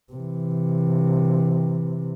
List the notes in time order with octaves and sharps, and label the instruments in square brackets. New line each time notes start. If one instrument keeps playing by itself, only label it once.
[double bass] C3 E3